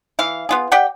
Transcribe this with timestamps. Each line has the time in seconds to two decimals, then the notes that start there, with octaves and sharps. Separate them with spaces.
0.19 E3 F5
0.49 B3 F4 G#4
0.72 G4 D5 F#5 G5